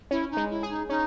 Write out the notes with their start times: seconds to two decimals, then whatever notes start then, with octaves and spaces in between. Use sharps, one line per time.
0.11 C#4 E4
0.31 D#4
0.37 G#3
0.50 E4
0.63 G#4
0.70 D#4
0.89 C#4 D#4